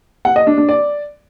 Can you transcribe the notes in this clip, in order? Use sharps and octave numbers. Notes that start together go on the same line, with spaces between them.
F#5
D#5
D4
D4
D5